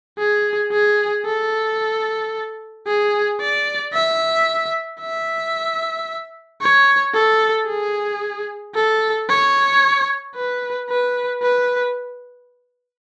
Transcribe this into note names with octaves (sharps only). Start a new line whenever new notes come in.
G#4
G#4
A4
G#4
D5
E5
E5
C#5
A4
G#4
A4
C#5
B4
B4
B4